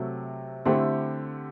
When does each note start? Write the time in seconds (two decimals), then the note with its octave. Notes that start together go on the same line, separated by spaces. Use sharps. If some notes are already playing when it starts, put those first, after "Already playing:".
Already playing: C3 F#3 A3
0.65 D3 A3 C4 E4 G4